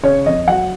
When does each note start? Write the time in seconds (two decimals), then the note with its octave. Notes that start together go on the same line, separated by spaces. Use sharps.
0.03 C#3 C#5
0.26 F2 D#5
0.47 F#3 F#5